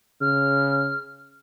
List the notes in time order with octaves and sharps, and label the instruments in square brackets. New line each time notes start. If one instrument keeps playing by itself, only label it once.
[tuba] C#3 [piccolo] F6